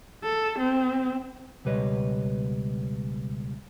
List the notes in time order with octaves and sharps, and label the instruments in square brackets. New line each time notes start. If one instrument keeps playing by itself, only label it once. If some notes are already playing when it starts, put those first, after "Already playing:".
[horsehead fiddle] A4
C4
[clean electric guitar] C#2 B2 G3 B4 C#5 D#5